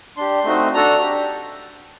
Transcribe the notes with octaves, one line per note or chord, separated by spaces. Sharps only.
D4 G4 C6
A3 C4 D#4 F#4
D4 F#4 A4 A#5
D4 G4